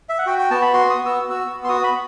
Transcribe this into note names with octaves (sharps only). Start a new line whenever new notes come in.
E5
F#5
F#4 G5
G5
B3 A5
B5
F#4 C6
D#6
B3
E6
F#4
E6
B3
C6
F#4 D#6
B5
B3